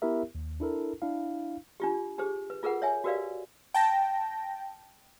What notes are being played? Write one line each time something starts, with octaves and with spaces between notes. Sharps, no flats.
B3 E4 G4 A#4 E5
D#2
D4 E4 A4 A#4
D4 E4 F5
D4 F4 G4
D4 G4 G#4 C5
B4
F4 G#4 A#4 B4 F#5
C#5 E5 G#5
F#4 G4 A#4 B4 D5 F5
G5 A5 A#6